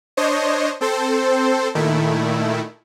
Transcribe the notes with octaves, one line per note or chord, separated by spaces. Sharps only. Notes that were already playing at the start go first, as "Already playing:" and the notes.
D4 C5 C#5 D#5
C4 A4 C5
A#2 D#3 A3 E4